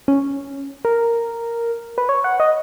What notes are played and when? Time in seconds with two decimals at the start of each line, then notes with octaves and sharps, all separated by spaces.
0.08 C#4
0.85 A#4
1.98 B4
2.09 C#5
2.24 F#5
2.40 D#5